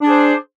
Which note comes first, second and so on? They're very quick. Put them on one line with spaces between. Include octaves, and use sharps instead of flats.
D4 G#4 C5